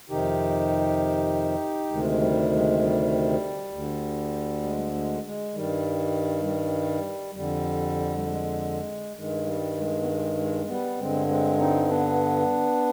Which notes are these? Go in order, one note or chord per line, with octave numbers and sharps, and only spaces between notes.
F2 C3 D#3 D#4 G4
D2 C3 D#3 G#3
G3
G#3
G3
D2
D3
G#3
G#3
G#3
G2 D#3 G3
G3
F2 D3 G3
G3
G#3
G2 D#3 G#3
G3
G#3
B3
G#3
G#3
G3 B3
G2 D3 G#3 C4
G#3 C4
C4 D#4
B3 D4